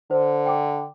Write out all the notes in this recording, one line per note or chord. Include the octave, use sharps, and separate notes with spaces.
D3 C5
G5 D6